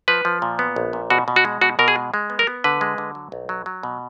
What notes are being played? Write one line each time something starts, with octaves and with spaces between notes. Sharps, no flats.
F3 B4
F3
A#2
B3
A#1
A#2
B2 F#4
B2
F#4
G#3
B2 F#4
B2 A#4
G#4
G#3
G#3
B3
A#4
B3
D3 B4
G#3
D3
F#3
B1
F#3
F#3
B2